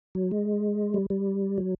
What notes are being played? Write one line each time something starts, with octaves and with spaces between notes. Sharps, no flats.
F#3
G#3
G3
G3
F#3